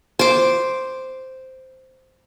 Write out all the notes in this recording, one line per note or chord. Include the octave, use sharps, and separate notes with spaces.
C5 D6